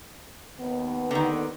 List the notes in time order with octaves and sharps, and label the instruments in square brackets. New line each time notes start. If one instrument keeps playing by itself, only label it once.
[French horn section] D#2 B3
[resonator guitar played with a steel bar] D3 D#3